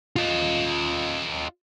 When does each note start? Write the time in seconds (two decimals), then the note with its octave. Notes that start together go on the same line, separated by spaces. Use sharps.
0.16 F4 D#5